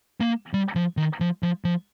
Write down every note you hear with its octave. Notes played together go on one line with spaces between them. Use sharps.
A#3
G3
F3
D#3
F3
F3
F3